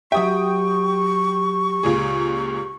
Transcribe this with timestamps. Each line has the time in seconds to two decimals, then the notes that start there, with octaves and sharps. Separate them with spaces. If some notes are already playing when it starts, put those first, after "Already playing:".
0.12 F#3 G4 E5 G5 C#6 D#6
1.83 C#2 A#2 G#4